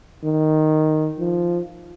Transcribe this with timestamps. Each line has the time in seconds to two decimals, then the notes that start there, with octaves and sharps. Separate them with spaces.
0.24 D#3
1.19 F3